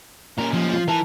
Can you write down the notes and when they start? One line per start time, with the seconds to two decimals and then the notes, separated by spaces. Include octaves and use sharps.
0.38 A#2 C#4 A#4
0.54 F3
0.73 F4
0.89 E3 A#4 A5